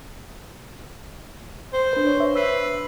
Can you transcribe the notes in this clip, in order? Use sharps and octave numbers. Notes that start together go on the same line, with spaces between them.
C5
D4 B4
C#5
E5
B4 E6 C7